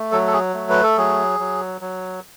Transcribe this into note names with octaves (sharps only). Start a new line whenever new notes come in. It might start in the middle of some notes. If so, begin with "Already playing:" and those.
Already playing: A3
F#3 A4
A4
G#4
A3
B4
A4
F#3 G#4
F#3
F#3